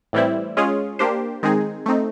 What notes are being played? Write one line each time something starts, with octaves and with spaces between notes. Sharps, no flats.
A2 E3 G3 C4 E4
G#3 C#4 F4 G#4
A#3 D4 G4 C5
D#3 G#3 C4 D#4 G#4
A3 C4 D#4